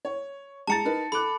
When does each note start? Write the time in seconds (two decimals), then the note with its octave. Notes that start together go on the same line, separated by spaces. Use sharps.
0.05 C#5
0.67 G#3 A5 A#5 A6 C#7
0.85 D#4 A#4 B4
1.12 A4 B5 D6 F#6